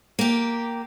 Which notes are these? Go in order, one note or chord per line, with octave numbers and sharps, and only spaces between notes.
A#3 G4